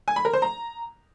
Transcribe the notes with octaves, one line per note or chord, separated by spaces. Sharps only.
G#5
B5
A#4
C5
A#5